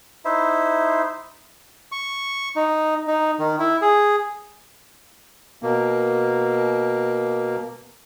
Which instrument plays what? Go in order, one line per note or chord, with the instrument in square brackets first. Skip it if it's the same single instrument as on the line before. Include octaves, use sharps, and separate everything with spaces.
[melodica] D#4 E4 C5 E5
[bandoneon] C#6
D#4
D#4
D#3
E4
G#4
B2 A#3